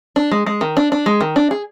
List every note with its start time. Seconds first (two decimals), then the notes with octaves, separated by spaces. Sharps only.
0.16 D4
0.31 G#3
0.46 G#3
0.61 D#3
0.77 D4
0.92 D4
1.06 G#3
1.21 D#3
1.36 D4
1.51 G#4